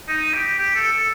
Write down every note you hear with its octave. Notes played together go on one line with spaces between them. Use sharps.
D#4
G4
G4
A4
A4